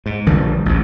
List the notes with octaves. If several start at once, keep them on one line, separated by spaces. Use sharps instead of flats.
G#2
A#1 D3 F3 G3
A1 D2 G#2